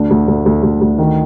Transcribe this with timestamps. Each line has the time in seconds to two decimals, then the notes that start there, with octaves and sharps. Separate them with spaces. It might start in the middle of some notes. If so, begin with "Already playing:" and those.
Already playing: D2 D4
0.10 D2
0.28 D2
0.46 D2
0.63 D2
0.81 D2
0.98 D#3